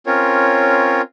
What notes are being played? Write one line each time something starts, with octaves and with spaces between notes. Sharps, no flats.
C4 C#4 F4 A#4 C#5